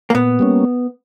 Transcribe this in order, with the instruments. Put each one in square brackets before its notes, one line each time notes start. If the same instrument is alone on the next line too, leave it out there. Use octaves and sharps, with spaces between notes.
[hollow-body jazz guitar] A#3
[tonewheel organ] A#2 [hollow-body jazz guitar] B3
[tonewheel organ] G3 A#3 C#4